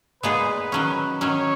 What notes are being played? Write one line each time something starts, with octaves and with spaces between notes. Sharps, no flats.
A#2 G#3 B3 D#4 G#4 B4
D#3 F#3 C#4
D#3 F#3 C#4 C#5